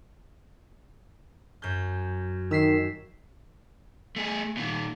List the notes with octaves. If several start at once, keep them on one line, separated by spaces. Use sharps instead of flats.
F#2 G6
D#3 E6 B6 C7
A3 G#4
A#2 D#3